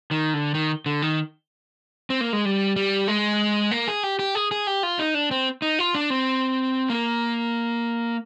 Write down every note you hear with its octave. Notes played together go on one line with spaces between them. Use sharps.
D#3
D3
D#3
D3
D#3
C4
A#3
G#3
G3
G3
G#3
A#3
G#4
G4
G4
G#4
G#4
G4
F4
D#4
D4
C4
D#4
F4
D4
C4
A#3